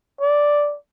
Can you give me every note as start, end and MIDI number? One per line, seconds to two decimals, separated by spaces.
0.21 0.76 74